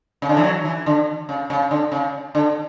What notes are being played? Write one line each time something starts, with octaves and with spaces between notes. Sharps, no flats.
C#3
D3
E3
F#3
E3
D3
C#3
C#3
D3
C#3
D3